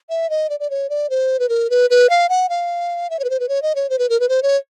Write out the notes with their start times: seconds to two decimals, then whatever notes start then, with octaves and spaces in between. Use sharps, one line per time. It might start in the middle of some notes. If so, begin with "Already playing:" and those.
0.10 E5
0.30 D#5
0.50 D5
0.60 D5
0.70 C#5
0.90 D5
1.10 C5
1.39 B4
1.49 A#4
1.70 B4
1.90 B4
2.10 F5
2.29 F#5
2.49 F5
3.10 E5
3.19 C#5
3.24 B4
3.30 C5
3.40 B4
3.49 C#5
3.62 D#5
3.75 C#5
3.90 C5
3.99 B4
4.09 A#4
4.20 B4
4.29 C5
4.43 C#5